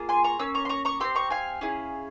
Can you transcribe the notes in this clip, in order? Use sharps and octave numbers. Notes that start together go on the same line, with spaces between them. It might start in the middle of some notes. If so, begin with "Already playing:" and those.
Already playing: A#3 F4 G#4
G#5 C6
A#5 C#6
A#3 C#4 E6
A#5 C#6
C6
A#5 C#6
A#5 C#6
C4 E4 G4 C6 E6
A#5 C#6
F5 G#5
C#4 E4 G#4